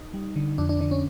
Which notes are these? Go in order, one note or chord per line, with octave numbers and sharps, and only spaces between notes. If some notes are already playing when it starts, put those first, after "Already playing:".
Already playing: D#4
G3
D3
F2 D4
D4
D3 D4
C#4